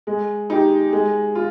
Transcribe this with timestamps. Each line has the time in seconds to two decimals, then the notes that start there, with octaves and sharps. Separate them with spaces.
0.07 G#3
0.50 D#4 G4
0.93 G#3
1.35 F4